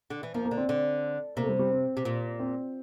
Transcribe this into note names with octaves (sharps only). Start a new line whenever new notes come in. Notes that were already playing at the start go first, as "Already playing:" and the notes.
D3
E3
F3 A#3
A#3
D3
C4
D3
C3 A#3
A3
G3
G3
C4
C3
A#2
C4